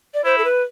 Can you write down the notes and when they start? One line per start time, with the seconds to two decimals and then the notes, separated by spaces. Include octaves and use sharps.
0.14 D5
0.25 E4 C5
0.38 A4
0.45 B4